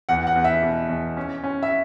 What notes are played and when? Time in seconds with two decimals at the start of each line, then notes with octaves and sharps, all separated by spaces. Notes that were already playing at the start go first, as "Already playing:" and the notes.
0.09 E2 F#5
0.27 F#5
0.36 E2
0.44 E5
0.62 B2
0.89 E2
1.17 C#4
1.44 C#4
1.63 E5